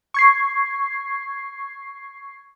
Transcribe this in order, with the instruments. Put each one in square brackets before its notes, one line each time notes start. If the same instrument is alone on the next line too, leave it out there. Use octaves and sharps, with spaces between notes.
[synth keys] C#6 G#6 C7